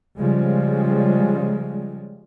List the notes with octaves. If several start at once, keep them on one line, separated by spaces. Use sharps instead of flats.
C#3 F3 G3 G#3